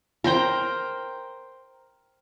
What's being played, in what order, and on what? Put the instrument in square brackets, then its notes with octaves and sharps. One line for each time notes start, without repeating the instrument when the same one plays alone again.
[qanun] A#4 C5 G5 A#5